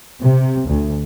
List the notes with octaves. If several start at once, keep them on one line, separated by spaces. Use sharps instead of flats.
C3
D2